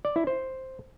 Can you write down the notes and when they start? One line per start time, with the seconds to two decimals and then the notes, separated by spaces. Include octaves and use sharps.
0.05 D5
0.16 E4
0.27 C5